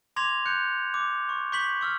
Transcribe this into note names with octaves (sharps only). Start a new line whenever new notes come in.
C6 D6 G#6 A#6 F7
F#6 G6 C#7
D6
C#6
C#6 G6 B6 F#7
C#6 E6 F6